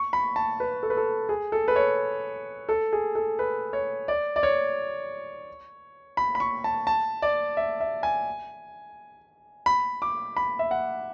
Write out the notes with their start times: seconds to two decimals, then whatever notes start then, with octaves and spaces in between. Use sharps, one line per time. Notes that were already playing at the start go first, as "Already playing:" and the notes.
Already playing: C#6
0.13 B5
0.36 A5
0.60 B4
0.83 A4
0.90 B4
0.97 A4
1.29 G#4
1.52 A4
1.68 B4
1.76 C#5
2.69 A4
2.93 G#4
3.15 A4
3.39 B4
3.73 C#5
4.08 D5
4.36 D5
4.43 C#5
6.17 B5
6.35 B5
6.40 C#6
6.64 A5
6.87 A5
7.22 D5
7.57 E5
7.80 E5
8.03 G#5
9.66 B5
10.02 D6
10.37 B5
10.59 E5
10.71 F#5